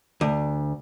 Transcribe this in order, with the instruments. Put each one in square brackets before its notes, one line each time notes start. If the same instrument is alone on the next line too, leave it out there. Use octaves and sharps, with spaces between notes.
[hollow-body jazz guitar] D2